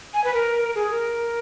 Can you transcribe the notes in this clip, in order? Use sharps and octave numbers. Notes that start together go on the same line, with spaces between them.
G#5
B4
A#4
G#4
A#4